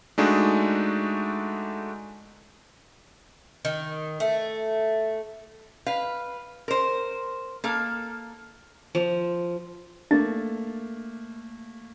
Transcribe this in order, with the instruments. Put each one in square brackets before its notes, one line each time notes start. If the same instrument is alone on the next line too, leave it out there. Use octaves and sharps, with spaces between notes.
[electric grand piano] G#3 A3 D4 D#4 F#4 G#4
[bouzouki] D#3
A3
[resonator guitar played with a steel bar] B4 F5
A#4 C5
A#3 A4 F5
[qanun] F3
[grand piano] A3 A#3 [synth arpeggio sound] D4 A6